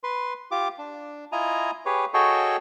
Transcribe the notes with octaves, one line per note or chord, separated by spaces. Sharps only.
B4 C6
F4 G4 D6
D4
E4 F4 D#5 G#5 A#5
G4 G#4 B4 C#5
F#4 G#4 A4 C#5 D#5 G5